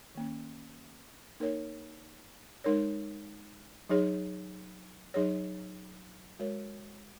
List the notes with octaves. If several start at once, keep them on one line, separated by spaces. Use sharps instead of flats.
D#3 A#3 C#4
A#3 D#4 A#4 C#5
G#3 D#4 A#4 C#5
F#3 D#4 G#4 C#5
F#3 D#4 G#4 C#5
G#3 F#4 A#4 C#5